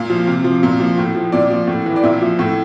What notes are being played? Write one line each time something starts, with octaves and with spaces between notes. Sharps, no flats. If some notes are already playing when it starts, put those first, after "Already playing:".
Already playing: A#2 F5
F3
C3
F3
A#2
F3
A2
F3
A#2 D5
F3
A2
E3
D5
A#2 E5
F3
A2